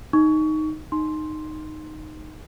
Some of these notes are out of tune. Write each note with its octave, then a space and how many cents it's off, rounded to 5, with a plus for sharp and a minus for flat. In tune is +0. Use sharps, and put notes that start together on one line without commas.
D#4 +0 C#6 +25
D#4 -10 C6 +5